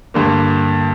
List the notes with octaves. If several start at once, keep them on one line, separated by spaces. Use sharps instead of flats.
G2 D3 A#3